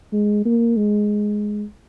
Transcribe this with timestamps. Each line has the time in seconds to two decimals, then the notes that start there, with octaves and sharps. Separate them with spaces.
0.12 G#3
0.45 A#3
0.77 G#3